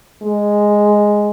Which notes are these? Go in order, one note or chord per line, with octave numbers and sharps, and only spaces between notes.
G#3